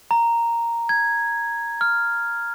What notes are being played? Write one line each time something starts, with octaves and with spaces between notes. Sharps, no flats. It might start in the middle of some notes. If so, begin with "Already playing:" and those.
A#5
G#6
F6